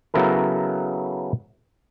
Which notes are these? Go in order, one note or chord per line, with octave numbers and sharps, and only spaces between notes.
C#3 F#3 B3 E4 A4 A#4